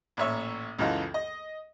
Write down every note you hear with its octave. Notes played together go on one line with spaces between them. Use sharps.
A1 A#2 C#5 E5 C#6
C#2 F#2 E3 D#4 F4 A4
D#5